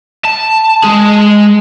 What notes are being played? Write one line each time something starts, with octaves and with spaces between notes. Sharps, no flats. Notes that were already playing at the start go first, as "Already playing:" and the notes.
A5
G#3 G#4